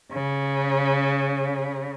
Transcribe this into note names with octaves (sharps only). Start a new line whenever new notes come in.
C#3